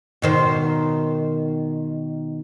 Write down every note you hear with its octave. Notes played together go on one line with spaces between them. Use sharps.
B2 D#3 C5